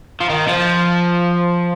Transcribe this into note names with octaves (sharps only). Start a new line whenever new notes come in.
F3
D#3
F3